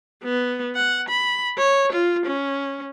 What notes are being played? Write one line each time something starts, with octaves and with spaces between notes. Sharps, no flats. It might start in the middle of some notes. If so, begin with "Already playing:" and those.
B3
F#5
B5
C#5
F4
C#4